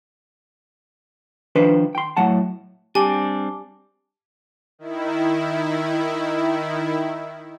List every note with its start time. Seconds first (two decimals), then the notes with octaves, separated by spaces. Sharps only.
1.55 D#3 F3 D4 B4 C5
1.95 G5 C6
2.17 A2 F#3 F#5 A5
2.95 G3 C4 D4 G4 G#5 A5 D6 G7
4.79 D#3 E4